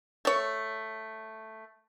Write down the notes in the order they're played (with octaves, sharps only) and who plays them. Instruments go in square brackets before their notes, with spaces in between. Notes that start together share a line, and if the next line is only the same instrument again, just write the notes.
[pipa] A3 C#5